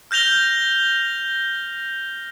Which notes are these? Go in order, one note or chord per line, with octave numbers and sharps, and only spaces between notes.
F6 G6 A#6 F7 G7